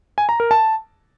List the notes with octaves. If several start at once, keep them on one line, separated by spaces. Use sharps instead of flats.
G#5
A#5
A#4
A5